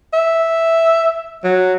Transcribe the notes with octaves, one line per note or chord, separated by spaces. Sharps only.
E5
F#3